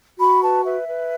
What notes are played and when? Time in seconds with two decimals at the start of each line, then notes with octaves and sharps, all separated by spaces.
0.19 F#4 B5
0.41 B4 A5
0.64 B4 E5
0.88 B4